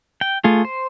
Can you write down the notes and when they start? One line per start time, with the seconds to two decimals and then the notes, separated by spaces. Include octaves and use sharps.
0.21 G5
0.44 A3 F4 G#4
0.65 C5